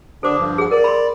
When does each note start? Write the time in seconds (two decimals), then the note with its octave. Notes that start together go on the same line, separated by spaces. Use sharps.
0.23 D3 D4 A4 C5 D6
0.38 G2 F3
0.58 G#4 F#5
0.71 A#4 D5
0.84 B5 C6